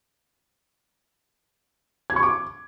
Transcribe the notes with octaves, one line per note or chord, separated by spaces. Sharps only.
G#6
C#6
D6